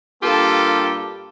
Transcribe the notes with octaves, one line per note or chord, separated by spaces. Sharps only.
G2 A#3 F4 G4 A4